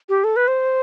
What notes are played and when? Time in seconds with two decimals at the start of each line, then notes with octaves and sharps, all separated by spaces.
0.09 G4
0.24 A4
0.36 B4
0.48 C5